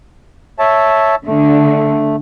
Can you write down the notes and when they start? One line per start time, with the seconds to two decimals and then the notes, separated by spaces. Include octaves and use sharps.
0.59 C#5 E5 A5
1.27 D3 A3